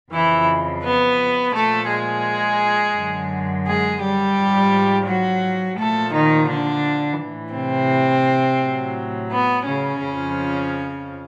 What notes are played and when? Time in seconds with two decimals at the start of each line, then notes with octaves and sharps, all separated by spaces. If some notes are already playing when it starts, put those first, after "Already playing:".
0.13 F2 C#3 E3 F3 E4
0.83 B3 B4
1.54 A#2 F3 A3 A4
1.89 G#3 G#4
2.96 F#2 D3 F#3
3.66 G#3 G#4
4.01 G3 G4
4.36 G#2 F3
5.07 F#3 F#4
5.77 A#2 F3 A3 A4
6.13 D#3 D#4
6.49 D3 D4
7.19 A2 E3
7.54 C3 C4
8.61 A2 F#3
9.31 B3
9.66 C#3 C#4
10.02 F2 C#3 F3